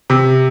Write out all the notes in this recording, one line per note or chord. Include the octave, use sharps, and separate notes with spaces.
C3